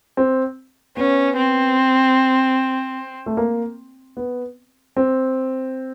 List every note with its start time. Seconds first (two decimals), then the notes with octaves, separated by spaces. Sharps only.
0.17 C4
0.97 B3 C#4
1.37 C4
3.26 A3
3.37 A#3
4.17 B3
4.97 C4